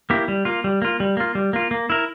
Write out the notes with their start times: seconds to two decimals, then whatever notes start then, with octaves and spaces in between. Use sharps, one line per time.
0.10 A#3 E4 G4
0.28 G3
0.45 A#3 F4
0.64 G3
0.82 A#3 F4
1.00 G3
1.17 A#3 F4
1.35 G3
1.53 A#3 F4
1.71 A#3
1.90 E4 A#4